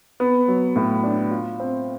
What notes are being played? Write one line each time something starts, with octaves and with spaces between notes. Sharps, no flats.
B3
F#3
A2
D4
F4
C4